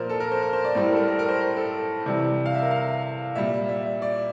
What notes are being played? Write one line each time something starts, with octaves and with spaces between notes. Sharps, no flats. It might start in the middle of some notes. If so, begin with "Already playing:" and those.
Already playing: A#2 F3 A#4 C5 D5
A4
A#4
C5
A#4
C5
D5
A2 G3 C5
A#4
A4
A#4
A#4
A#4
C5
C5
A4
C3 E3 G3
F5
E5
A#4
F5
A#2 G3 E5
E5
D5